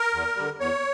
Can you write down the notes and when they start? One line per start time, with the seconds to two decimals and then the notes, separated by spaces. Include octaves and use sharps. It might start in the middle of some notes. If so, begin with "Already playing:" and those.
Already playing: A#4
0.14 E2
0.36 D3 G3
0.60 E2 C#5